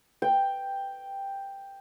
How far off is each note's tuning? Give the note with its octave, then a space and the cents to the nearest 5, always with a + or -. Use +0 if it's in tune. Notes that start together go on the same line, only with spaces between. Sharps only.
G5 +5